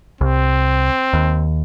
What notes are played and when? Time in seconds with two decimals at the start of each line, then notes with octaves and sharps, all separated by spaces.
0.21 C2 C4
1.13 D#2